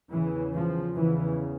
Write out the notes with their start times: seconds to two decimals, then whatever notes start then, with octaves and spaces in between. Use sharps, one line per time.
0.11 E2 C#3 E3
0.54 F3
0.96 E2 C#3 E3